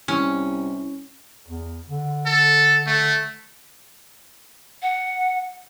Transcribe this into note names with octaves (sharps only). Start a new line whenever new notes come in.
C2 C#4
E2
D3
A4
A3
F#5